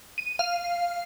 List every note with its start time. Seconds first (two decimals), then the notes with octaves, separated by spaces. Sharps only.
0.18 D#7
0.39 F5